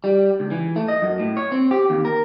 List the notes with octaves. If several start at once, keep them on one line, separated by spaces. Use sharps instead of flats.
G3
C#2
E3
A3
D#5
F#2
A2
C#5
C4
G4
D#2
A#4